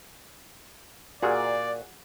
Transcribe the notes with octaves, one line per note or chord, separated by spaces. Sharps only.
A#2 F#4 G#4 D5